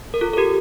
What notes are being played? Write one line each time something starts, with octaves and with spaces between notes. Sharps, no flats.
A#4
F4 A4
A4
G4 A#4